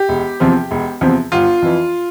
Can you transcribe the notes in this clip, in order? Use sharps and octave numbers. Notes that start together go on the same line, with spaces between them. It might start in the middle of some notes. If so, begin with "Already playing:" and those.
Already playing: G4
E1
E2 C3 F3 C4
E1
E2 C3 F3 C4
G1 F4
F2 E3